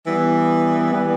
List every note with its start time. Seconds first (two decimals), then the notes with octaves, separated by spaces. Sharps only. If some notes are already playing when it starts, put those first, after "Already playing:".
0.06 E3 G3 B3
0.91 E3 G3 B3